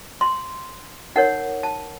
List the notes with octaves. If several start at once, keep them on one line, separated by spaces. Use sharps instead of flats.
C6
D#4 A#4 C#5 F#5
A5